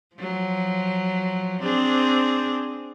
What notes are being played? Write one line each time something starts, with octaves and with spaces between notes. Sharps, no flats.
F3 F#3
C4 D4 G#4